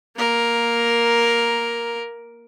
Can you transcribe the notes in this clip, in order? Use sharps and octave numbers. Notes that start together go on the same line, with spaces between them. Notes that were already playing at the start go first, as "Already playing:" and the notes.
A#3 A#4